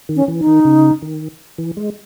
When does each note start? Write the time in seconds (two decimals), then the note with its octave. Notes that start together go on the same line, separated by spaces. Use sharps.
0.09 D#3
0.16 C#4
0.28 E3
0.40 D#4
0.47 D#3
0.65 C#3
1.02 D#3
1.58 E3
1.77 G#3